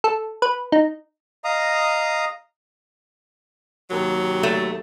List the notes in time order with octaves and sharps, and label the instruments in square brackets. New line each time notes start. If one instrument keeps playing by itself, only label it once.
[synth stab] A4
B4
D#4
[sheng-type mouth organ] D#5 F5 A#5 D#6
[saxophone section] D#2 C3 F#3
[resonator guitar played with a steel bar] A3